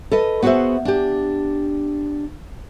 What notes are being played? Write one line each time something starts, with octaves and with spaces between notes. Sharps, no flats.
A4 B4 D#5
B3 F#4 G#4 B4 C5 E5
D4 G4